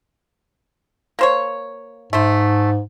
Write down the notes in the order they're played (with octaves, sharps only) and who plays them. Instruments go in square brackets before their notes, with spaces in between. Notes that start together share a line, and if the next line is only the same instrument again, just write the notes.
[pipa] A#3 C5 C#5
[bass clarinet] G#2 [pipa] A3 C5